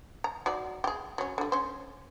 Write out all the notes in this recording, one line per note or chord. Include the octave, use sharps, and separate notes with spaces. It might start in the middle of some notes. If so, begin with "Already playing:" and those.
A#5
F#3 D#4 D5
G4 G#4
F#3 C#4
D3 G3
C#4 C5